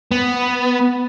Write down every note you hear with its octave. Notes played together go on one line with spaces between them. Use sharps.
B3